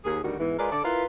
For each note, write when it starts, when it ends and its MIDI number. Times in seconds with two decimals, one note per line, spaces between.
0.05 0.22 39
0.05 0.22 68
0.23 0.37 38
0.23 0.37 51
0.23 0.37 55
0.23 0.37 66
0.40 0.58 40
0.40 0.58 44
0.40 0.58 52
0.59 0.68 56
0.59 0.68 65
0.59 0.68 70
0.59 0.68 71
0.59 0.68 74
0.72 0.80 50
0.72 0.80 69
0.72 0.80 74
0.84 1.04 64
0.84 1.04 65
0.84 1.04 70
0.84 1.04 71